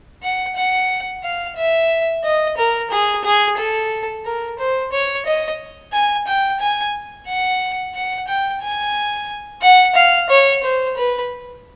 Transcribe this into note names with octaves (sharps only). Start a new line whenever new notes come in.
F#5
F#5
F5
E5
D#5
A#4
G#4
G#4
A4
A#4
C5
C#5
D#5
G#5
G5
G#5
F#5
F#5
G5
G#5
F#5
F5
C#5
C5
B4